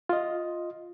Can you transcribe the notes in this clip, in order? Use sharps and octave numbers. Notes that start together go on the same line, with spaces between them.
F4 D#5